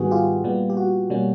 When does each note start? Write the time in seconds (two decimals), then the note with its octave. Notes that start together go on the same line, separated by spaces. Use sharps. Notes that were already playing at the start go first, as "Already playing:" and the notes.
Already playing: G#2 D#3 G3 B3 F#4 G#4
0.11 F4 G4
0.44 A#2 G3 B3
0.70 G4
0.77 F#4
1.10 B2 G3 A#3 C#4